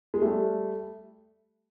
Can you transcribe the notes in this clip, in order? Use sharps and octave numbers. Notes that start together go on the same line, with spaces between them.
G#3
G3 A3